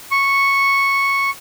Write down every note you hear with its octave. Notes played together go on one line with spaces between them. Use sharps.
C#6